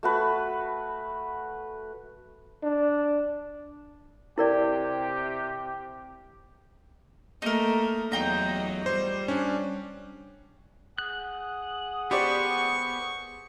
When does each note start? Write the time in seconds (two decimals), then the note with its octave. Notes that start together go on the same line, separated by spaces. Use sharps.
0.03 A3 F#4 B4
2.63 D4
4.38 C3 E4 G4 A#4 D5
7.42 A3 A#3 D#4 A#4
8.12 E2 F#3 D#4 F4 G5 A#5
8.86 G3 C5
9.28 C#4 D4
10.98 G#4 F#5 D#6 F#6
12.11 B3 G4 C5 D5 C#6